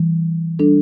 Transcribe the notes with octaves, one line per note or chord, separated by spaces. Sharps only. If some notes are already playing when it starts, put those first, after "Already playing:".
Already playing: E3 G3
G3 D4 A4